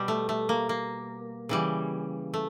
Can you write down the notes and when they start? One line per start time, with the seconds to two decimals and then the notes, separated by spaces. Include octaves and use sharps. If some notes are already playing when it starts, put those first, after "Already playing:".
Already playing: B2 G3
0.08 A3
0.29 A3
0.49 A#3
0.69 A#3
1.49 C#3 E3 G3
2.34 A3